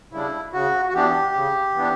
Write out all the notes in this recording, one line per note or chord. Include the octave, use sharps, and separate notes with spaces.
C#3 G3 D4 E4
C#3 F#4
F#4
E3 B3 D4 G4
C#3
E3 B3 D4